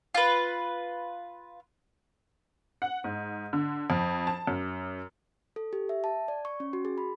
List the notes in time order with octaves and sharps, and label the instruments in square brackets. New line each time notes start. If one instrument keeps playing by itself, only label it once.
[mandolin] F4 B4
[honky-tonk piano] F#5
G#2
D3
F2
A5
F#2
[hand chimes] A4
G4
E5
A5
D5
C#6
C#4
F#4
G#4
B5